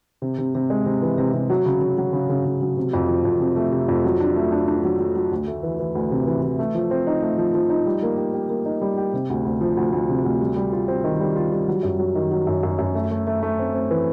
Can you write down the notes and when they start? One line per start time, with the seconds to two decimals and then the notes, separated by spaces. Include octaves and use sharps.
0.22 C3
0.38 C3
0.55 C3
0.70 G#3
0.86 C3
1.02 E3
1.18 C3
1.33 C3
1.50 F#3
1.66 C#3
1.81 C#3
1.98 F#3
2.13 C#3
2.29 C#3
2.45 C#3
2.61 F#3
2.77 C3
2.93 F2
3.08 F3
3.25 F2
3.40 C3
3.56 A3
3.72 C3
3.88 F2
4.05 F#3
4.20 D4
4.36 A3
4.52 D4
4.67 D4
4.84 F#3
4.99 F#3
5.15 F#3
5.31 D2
5.47 A3
5.63 E3
5.79 E3
5.95 D2
6.11 C3
6.27 E3
6.43 E3
6.59 A3
6.75 F3
6.91 C4
7.07 D#4
7.22 A3
7.38 F3
7.54 F3
7.70 D#4
7.86 G3
8.02 A#3
8.17 G4
8.34 G4
8.50 A#3
8.66 D#4
8.82 G3
8.97 G4
9.13 C3
9.30 D2
9.45 D2
9.61 F3
9.77 D2
9.93 D2
10.09 C3
10.24 D2
10.40 G3
10.56 G3
10.73 F4
10.88 C4
11.04 D#3
11.20 G3
11.36 F4
11.52 G3
11.68 F#3
11.83 F#2
11.99 F#3
12.15 D#3
12.31 F#3
12.47 F#2
12.63 F#2
12.79 F#2
12.94 A3
13.11 A3
13.27 A3
13.43 A3
13.59 C4
13.74 C4
13.91 E3